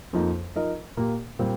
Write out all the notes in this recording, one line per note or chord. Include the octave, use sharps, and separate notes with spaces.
F2 F3 A#3 D#4
F3 D#4 A#4 D#5
A#2 A#3 G4
A#2 G3 C4